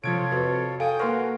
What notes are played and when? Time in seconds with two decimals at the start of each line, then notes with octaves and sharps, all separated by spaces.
0.04 C3 F3 F4 A4 C#5 G#6 D7
0.31 F2 F#4 B4
0.80 A4 F5 G5 G#5 D#6 G6 D7
1.00 A#3 F#4 A#4 B4 F5 C6 C#6